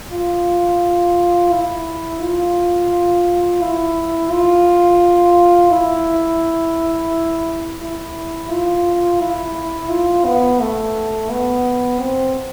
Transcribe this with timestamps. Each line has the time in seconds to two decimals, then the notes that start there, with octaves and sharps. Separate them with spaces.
0.12 F4
1.52 E4
2.21 F4
3.61 E4
4.31 F4
5.72 E4
7.80 E4
8.50 F4
9.20 E4
9.90 F4
10.25 B3
10.60 A3
11.30 B3
11.99 C4